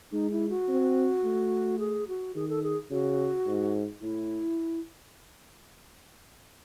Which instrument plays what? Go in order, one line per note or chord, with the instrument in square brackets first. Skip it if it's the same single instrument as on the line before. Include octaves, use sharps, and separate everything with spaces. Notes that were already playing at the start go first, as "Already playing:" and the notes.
[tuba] G#3 [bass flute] D#4
[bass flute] E4
F#4
[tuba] C4
A3
[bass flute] G#4
F#4
[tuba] D#3 [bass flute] G#4
[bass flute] A4
G#4
[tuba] C#3 [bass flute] F#4
[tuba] G#2
[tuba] A2 [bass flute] E4